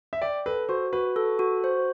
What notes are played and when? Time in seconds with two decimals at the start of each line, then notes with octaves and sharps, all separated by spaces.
0.13 E5
0.22 D5 G5
0.46 A4 B4
0.69 F#4 C5
0.93 F#4 B4
1.16 A4
1.39 F#4
1.64 C5